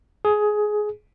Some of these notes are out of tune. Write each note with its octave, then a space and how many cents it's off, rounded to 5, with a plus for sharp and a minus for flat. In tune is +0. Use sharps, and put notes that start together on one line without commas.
G#4 +15